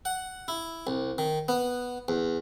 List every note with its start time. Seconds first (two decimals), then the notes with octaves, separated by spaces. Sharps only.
0.05 F#5
0.48 E4
0.87 C2
1.18 D#3
1.48 B3
2.08 E2